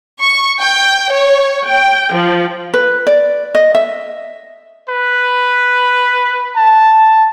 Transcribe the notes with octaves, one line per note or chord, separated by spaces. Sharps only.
C#6
G5
C#5
G5
F3
B4
D5
D#5
E5
B4
A5